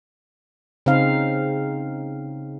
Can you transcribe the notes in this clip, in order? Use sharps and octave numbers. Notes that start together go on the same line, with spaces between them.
C#3 C4 D#4 F5